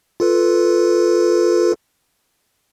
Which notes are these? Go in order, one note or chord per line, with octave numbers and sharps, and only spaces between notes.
F4 A4 B4